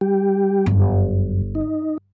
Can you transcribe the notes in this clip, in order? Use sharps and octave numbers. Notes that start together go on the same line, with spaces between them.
G3 G4
G1 F#2
D#4